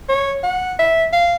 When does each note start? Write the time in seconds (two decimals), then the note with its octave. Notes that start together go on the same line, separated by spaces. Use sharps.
0.09 C#5
0.43 F#5
0.79 E5
1.13 F5